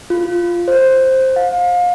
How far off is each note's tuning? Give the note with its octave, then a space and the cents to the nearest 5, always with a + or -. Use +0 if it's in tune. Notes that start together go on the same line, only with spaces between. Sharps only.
F4 -5
C5 +5
F5 +35